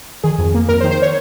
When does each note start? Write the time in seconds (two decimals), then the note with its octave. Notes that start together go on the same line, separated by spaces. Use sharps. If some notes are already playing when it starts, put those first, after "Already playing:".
0.24 D#3 G#4
0.38 F2
0.54 A#3
0.69 F2 A#4
0.80 C5
0.84 D#3
0.91 C5
1.02 C#5